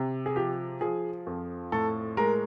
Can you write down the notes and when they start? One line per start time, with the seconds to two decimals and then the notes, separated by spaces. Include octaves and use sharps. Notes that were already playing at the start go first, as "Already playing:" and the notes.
Already playing: C3
0.26 G#4
0.36 F3 G4
0.81 F3 G#4
1.27 F2
1.72 A2 A4
2.17 G#3 A#4